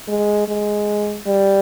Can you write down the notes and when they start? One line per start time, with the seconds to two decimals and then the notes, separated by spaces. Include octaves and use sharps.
0.08 G#3
0.48 G#3
1.27 G3